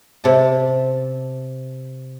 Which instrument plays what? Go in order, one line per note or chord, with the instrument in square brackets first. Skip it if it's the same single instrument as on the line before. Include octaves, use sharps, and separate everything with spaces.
[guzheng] C3 A5